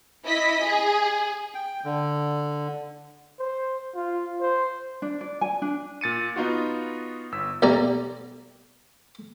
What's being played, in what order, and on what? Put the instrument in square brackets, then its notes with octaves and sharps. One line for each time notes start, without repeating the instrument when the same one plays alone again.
[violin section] E4 D#5 B6
G#4
[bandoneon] G5
D3
[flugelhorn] C5
F4
C5
[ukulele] D4
D5
G#5
D4
[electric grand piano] A#2 A6 C#7 D#7
B3 D#4 F4 F#4
G1 E6 B6
[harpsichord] B1 G3 D5 A#5